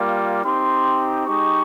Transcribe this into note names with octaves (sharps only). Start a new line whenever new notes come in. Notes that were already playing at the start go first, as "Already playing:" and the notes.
Already playing: G3 A#3 F4
C4 D#4 G4 C6
G#3 D#4 G4 C#6